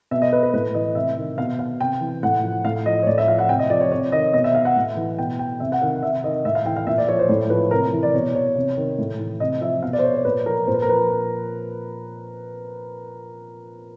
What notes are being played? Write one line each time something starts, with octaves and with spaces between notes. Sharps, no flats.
B2 E5
D#5
B4
B4
A2 B4
E3 D#5
C3 E5
D#3
B2 F5
F5
C3 G5
E3
A2 F#5
F3
A2 F5
F3 D#5
C#5
A2 D5
E5
F3 F5
F#5
C3 G5
D#5
F3 D5
C#5
C3 C#5
D#3 D#5
B2 D#5
E5
F5
F#5
A2
E3
B2 G5
G5
C3 E5
F#5
D#3 F5
C3 E5
D#3 D#5
A2 E5
F5
E3 G5
F5
A#2 E5
D5
F3 C#5
C5
A2 C#5
F3 B4
C3 A#4
E3
D5
B2 C#5
C#5
C3
D#3
A2
E3
C3 D#5
F3 E5
B2 F5
D5
C5
C#5
C5
A#2 B4
F3 A#4
A#2 C5
B4
A#4
F3 B4